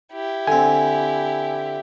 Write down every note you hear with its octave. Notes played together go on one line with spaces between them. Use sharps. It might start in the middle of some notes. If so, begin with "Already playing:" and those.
E4 G4
D3 C4 G#5